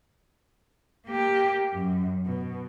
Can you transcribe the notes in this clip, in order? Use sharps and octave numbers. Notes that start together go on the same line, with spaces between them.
A#3 G4
F#2
B2